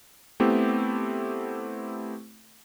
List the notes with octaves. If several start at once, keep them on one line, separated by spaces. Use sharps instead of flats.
A3 B3 C4 E4 G4